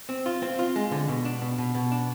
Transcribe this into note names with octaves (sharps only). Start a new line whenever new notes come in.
C4
F4
C4
F4
G#3
D3
B2
D4
B2
B2
B2
D4